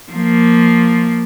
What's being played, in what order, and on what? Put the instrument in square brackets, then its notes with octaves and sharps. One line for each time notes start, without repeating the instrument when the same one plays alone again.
[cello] F3 A#3